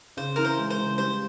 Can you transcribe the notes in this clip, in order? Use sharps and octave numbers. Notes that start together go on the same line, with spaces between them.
C#3 C5
E3 A#4
C5
G#3
C5
C#3
G3 C5